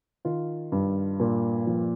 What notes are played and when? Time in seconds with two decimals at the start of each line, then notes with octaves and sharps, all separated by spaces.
0.25 D#3 F4
0.72 G2
1.20 A#2
1.67 F3